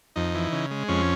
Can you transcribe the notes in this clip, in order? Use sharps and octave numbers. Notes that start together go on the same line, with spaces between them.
F2 D#4
E3
C#3
G#3
F2 C#4